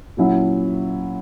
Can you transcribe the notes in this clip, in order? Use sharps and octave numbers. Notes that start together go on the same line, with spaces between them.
A#2 F#3 C#4 E4